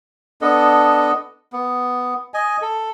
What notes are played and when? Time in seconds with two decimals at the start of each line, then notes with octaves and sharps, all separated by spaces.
0.41 B3 D4 A4 D#5
1.53 B3
2.34 D#5 G#5
2.62 A4